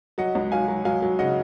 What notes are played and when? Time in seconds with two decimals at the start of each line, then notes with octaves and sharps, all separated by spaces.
0.18 F#3 D#5 F#5
0.35 C#2
0.52 F#3 F5 G#5
0.68 F#3
0.85 F#3 F5 G#5
1.02 F#3
1.19 C#3 D#5 F#5